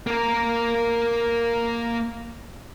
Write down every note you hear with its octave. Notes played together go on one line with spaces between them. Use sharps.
A#3 A#4